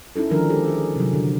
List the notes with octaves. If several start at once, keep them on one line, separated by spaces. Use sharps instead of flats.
C#4 D#4 E4 A4
D3 D#3 F3 G#3 D4 A#4
G#3 G4 A4
G#4
C3 F#3
D3